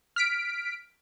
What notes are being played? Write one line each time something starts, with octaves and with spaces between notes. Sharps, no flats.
F6 B6 D7